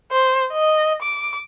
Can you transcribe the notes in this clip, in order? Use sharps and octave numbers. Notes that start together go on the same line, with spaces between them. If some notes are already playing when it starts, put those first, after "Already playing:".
C5
D#5
D6